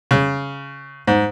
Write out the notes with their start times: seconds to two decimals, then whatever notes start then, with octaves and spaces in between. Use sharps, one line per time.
0.11 C#3
1.07 G#2